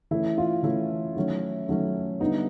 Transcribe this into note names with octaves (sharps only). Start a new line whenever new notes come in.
E3 A3 C#4 E4
F4
E3 A3 C#4 E4
D#3 F#3 A3 C#4
D#3 F#3 A3 C#4
D3 G3 B3 D#4